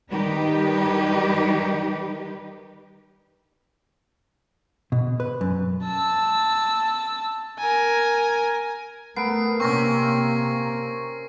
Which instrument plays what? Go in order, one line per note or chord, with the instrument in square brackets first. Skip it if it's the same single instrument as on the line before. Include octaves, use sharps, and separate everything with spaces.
[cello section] D#3 G3 D#4 G4 B4
[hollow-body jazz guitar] B2
B4
F#2
[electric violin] A5 E6
A#4 G#5
[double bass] A3 [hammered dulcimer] B3 A#4 [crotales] C7 D7
[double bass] C3 A#3 [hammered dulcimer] C4 C#4 [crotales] C#6 A#6